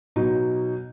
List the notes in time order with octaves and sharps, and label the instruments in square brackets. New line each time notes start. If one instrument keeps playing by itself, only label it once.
[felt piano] B2 F#3 D#4